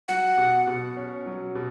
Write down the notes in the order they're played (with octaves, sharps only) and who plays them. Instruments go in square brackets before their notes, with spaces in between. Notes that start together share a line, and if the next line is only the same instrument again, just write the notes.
[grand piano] F#3 [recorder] F#5
[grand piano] B2
B2
C#4
F#3
B2